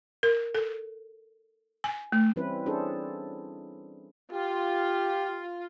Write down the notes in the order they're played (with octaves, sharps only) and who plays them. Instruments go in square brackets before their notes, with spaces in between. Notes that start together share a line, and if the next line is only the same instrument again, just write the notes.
[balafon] A#4
A4
G#5
A3
[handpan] E3 G3 C4 C#4 E4 B4
C#4 D4 E4 G#4 A4 C5
[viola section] F4 [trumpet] G4